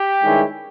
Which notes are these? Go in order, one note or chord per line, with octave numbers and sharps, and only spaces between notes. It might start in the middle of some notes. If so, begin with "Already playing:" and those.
Already playing: G4
G2 D#3 G#3 C#4 E4